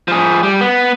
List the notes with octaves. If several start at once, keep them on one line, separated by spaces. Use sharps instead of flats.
F3 G#4
G3
B3